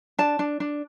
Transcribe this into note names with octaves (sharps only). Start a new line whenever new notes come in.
D4 A5
D4
D4